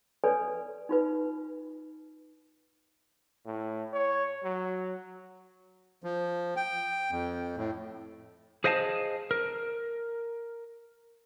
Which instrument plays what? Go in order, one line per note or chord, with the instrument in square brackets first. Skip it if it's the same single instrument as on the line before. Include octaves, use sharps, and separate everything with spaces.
[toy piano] A4 B4 C#5 D5 G#5
D#4 F4 B4
[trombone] A2
C#5
F#3
[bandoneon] F3
G5
F2
A2
[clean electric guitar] G#4 C5 D#5 F5 F#5 A5
A#4